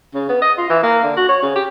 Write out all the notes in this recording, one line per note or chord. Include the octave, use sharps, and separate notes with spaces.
C#3
B3
D#5
F4
E3
A#3
D3
F#4
C#5
C#3
G4